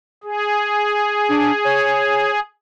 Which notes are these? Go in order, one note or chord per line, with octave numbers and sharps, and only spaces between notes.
G#4
D4
C#5